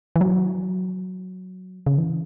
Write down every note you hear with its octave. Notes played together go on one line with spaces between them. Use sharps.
E3
F#3
C#3
E3